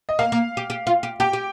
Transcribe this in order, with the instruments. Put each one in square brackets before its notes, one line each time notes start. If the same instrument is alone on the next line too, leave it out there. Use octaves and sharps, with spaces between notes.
[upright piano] D#5
[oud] A#3 [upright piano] F5
[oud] A#3
G4
G4
F4
G4
[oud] G4 [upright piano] G5
[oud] G4